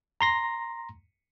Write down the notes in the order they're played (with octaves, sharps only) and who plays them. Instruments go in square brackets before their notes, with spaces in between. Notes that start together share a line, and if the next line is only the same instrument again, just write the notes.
[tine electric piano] A#5 C6 A#6